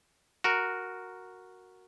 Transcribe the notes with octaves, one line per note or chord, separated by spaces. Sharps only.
F#4 A#4